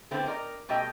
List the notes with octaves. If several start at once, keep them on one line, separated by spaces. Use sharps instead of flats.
D3 A3 B3 C4 E4
A#4 C5 D5 D#5
B2 G3 A3 G4 D#5 G5